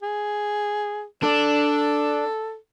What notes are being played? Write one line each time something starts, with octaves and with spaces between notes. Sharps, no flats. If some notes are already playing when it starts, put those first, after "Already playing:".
G#4
D4 A4